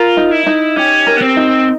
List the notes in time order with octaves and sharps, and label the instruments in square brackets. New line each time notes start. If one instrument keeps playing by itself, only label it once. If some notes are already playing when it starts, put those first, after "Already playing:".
Already playing: [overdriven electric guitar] F4 [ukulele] A#4
[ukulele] D#4
[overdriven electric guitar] E4
[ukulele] D#4
[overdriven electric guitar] C#4 [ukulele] G4
[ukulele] A#4
[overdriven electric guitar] B3
C4
[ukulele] D#4